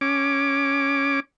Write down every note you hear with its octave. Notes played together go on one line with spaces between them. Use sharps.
C#4 D6